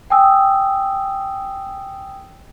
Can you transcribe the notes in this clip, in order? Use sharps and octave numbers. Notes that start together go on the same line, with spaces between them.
G5 G#5 D#6 E6